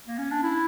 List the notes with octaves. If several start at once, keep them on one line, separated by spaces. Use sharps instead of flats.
A#3
C#4
D4
E4